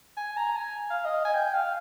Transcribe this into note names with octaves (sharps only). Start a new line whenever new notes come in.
G#5
A#5
G#5
F5
D#5
G#5
G5
F5